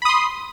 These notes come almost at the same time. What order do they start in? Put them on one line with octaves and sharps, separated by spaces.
B5 D#6 C6